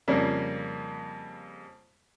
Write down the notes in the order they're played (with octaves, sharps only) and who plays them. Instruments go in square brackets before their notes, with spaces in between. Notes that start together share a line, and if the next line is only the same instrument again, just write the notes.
[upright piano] F2 C#3 G3 A#3